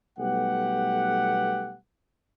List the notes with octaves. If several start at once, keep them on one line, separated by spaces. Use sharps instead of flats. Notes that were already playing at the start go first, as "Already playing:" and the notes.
B1 G3 A3 B3 G4 F#5